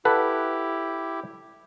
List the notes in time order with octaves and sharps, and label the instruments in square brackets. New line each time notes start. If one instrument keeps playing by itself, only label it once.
[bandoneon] E4 G4 [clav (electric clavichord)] A4 B4 F#5